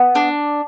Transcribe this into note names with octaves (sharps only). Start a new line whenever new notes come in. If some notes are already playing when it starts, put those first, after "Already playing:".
Already playing: B3
D4